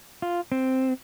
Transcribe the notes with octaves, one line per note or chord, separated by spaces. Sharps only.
F4
C4